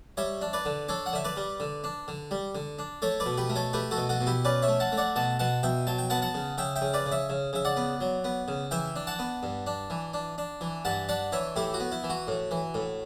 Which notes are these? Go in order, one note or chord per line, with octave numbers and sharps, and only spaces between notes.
G3 C#5 E5
D4
B4 D5
D3
D4 A4 C#5
F#5
D3 E5
B4 D5
G3
D3
D4
D3
G3
D3
D4
A3 A4 C#5
B4 D5
B2
G4 B4
A3
A4 C#5
A3 G4 B4
F#4 A4
B2
F#4 A4
B2
E4 G4
C#4 B4 D5
C#5 E5
A3
F#5 A5
A3
D5 F#5
B2 F#5 A5
B2 F#5 A5
B2 E5 G5
F#3 A5
G5
B3 F#5 A5
F#5 A5
C#3
C#3 E5 G5
E5 G5
C#3
B4 D5
C#3
C#5 E5
C#3
C#3 E5
D5 F#5
B3
F#3
B3
C#3
E3 E5 G5
D4
F#5 A5
B3
G2
D4
E3
D4
D4
E3
G2 F#5 A5
D4 D5 F#5
E3 C#5 E5
A2 E4 G4
F#4
B3
E4
E3
F#4
A2
E3
A2